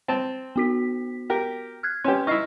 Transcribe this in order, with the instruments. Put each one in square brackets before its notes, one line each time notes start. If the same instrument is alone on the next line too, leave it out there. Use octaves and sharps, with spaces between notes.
[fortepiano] C4 A5 [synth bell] G5
[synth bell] B3 F#4 B6
[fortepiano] G4 A#4
[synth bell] F6 F#6 G#6
[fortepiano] C#4 G4 [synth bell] B4 G#5 C6
[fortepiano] D#4 E4 [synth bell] C#6 F6 C7